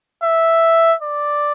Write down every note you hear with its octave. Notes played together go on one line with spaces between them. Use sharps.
E5
D5